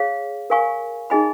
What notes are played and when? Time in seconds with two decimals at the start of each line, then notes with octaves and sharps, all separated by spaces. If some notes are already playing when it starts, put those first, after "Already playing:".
Already playing: G#4 C#5 F5
0.50 A#4 F5 G#5 C#6
1.10 D#4 G#4 D#5 G#5 B5